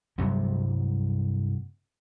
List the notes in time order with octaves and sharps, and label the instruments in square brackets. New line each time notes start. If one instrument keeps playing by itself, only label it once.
[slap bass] G2 C3 F#3 G3